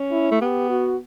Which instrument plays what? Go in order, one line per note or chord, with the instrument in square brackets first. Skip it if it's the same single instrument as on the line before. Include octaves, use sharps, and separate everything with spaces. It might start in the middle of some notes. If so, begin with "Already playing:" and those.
Already playing: [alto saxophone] C#4
[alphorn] E4
[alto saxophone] A3
[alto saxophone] B3 [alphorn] G4
[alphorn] F#4